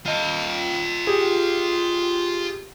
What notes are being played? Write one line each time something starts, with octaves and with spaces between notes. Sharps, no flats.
F4 D#5
G4 G#4